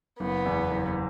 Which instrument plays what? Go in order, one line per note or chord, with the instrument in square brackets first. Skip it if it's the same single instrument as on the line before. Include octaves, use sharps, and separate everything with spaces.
[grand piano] F#1 [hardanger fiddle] B3
[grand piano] E2
F#1